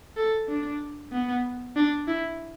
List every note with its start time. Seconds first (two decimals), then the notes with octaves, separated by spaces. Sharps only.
0.17 A4
0.48 D4
1.12 B3
1.76 D4
2.08 E4